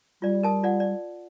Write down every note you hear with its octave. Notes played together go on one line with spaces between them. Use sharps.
G3 F4 D5
A#4 A5 D#6
F4 D5 F#5
D5